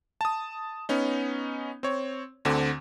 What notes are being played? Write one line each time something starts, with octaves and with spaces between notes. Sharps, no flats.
A5 D#6
B3 C#4 D#4
C4 C#5
D2 D3 C4